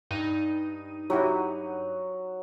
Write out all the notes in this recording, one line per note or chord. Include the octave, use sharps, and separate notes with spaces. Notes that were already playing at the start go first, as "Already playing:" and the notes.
G2 D#4 D#7
F#3 E4 F#4 G4